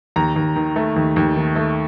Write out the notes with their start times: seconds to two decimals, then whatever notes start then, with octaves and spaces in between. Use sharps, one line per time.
0.16 D#2 A#5
0.36 D#2
0.56 D#3
0.76 A3
0.96 D#2
1.16 D#2
1.36 D#3
1.56 A3